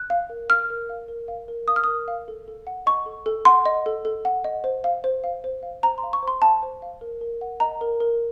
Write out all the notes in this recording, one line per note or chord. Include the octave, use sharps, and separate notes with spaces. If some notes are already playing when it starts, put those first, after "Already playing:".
Already playing: F#6
F5
A#4
F5 F6
A#4
F5
A#4
F5
A#4
F5 D#6
F6
A#4 D#6
F5
A4
A4
F#5
D#5 C#6
A4
A4
F#5 C6
D#5
A4
A4
F#5
D#5
C5
F5
C5
F5
C5
F5
C5 A#5
C6
F5
C#6
C5
C6
F5 A5
C5
F5
A#4
A#4
F#5
D#5 A#5
A#4
A#4